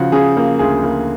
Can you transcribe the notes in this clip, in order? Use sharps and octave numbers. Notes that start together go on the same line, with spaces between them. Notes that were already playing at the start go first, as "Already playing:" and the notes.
Already playing: C#3 F3 F#4
C#3 G#4
A#3
D2 G#4
A#3